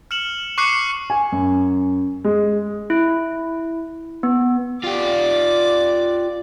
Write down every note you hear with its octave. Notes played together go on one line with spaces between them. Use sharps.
F6 C#7 E7 F#7
C#6 D6 F#6 C7 C#7
G#5
F#2
G#3
E4
B3
F4 G4 D5 D6